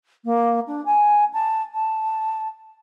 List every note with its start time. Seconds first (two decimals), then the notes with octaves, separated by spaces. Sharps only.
0.25 A#3
0.67 D4
0.85 G#5
1.33 A5
1.74 A5